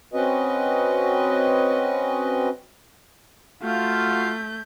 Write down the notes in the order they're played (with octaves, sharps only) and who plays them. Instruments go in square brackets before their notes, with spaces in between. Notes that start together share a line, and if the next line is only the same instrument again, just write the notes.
[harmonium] C4 C#4 F#4 B4 D#5
[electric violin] A3 G6 [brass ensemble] F4 F#4 F5